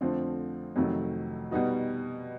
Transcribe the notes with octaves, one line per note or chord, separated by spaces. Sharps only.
F2 D3 F3 A3 C4
F2 C3 D#3 F#3 A3
B2 G3 B3 D#4 F#4